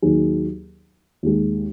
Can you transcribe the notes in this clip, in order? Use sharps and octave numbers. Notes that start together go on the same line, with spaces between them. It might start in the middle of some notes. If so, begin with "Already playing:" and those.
D#2 D#3 F#3 D#4 G#4
D#2 D#3 G#3